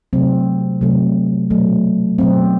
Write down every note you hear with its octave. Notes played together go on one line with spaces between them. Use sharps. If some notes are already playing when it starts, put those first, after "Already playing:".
C3 F#3 A3 C4
C3 F#3 A3
B2 F#3 A3
B2 F#3 A3 C4